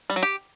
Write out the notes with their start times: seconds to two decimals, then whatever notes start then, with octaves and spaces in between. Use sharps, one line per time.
0.10 G3
0.16 F#3
0.23 G4